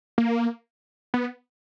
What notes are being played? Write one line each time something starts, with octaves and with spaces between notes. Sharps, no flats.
A#3
B3